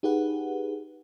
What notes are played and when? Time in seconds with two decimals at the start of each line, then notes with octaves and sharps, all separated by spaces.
0.03 D#4 G4 G#4 B4 F#5